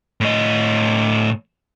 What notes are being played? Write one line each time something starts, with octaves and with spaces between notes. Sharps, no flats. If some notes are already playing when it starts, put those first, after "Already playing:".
A2 D#5